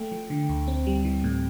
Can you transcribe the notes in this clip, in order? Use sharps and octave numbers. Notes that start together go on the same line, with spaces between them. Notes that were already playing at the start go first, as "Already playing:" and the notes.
Already playing: A3 G5
F3
D3
D2
C4
G3
E3
A2